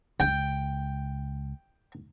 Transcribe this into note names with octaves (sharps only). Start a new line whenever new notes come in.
C#2 G5